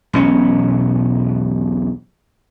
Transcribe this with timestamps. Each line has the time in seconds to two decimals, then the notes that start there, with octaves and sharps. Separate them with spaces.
0.13 E1 B1 C#4